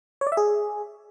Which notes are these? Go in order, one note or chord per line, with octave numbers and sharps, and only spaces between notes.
C#5
D5
E5
G#4